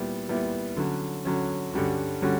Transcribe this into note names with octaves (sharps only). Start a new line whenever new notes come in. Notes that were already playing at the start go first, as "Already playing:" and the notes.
Already playing: A#2 G3 B3 E4
A#2 G3 B3 E4
D3 F#3 C#4
D3 F#3 C#4
G2 D3 G3 C#4 F#4
D3 G3 C#4 F#4